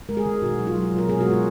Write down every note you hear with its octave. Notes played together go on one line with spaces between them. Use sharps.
G#3 A#4
G#4
D#3
B2 F#4
F#3
F4
F#3
B2
A#4
B2 G#4
G#3 F#4
F4